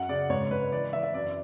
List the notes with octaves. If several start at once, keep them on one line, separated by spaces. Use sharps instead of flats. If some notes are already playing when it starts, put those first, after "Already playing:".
Already playing: F#2 F#5
C#3 D5
G#2 C#5
G#2 B4
E3 D5
E3 E5
E5
F#2 D5